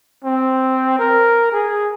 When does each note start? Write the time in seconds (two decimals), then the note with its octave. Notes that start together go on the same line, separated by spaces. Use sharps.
0.25 C4
0.99 A#4
1.53 G#4